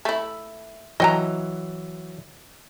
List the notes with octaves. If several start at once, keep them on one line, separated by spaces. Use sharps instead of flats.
A3 E4
E3 F#3 D#5 G5 A#5